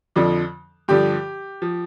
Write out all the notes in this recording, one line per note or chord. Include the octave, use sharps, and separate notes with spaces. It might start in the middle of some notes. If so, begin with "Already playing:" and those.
F2 D3 F3
G2 D3 F3 G4
F3